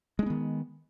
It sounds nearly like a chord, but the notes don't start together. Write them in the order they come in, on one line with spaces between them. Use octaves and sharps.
G#3 D4 B3 D#3